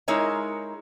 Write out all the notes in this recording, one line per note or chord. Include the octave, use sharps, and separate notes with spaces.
G#3 D#4 E4 A#4 C#5 A#5